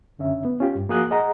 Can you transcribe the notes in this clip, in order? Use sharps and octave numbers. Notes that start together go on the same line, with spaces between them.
F#2 D3 C#4 E5
B3
C#4 F4 G4
G2
F3 A#3 F#4 G#4 D#6 F#6
G#4 D#5 F#5 A#5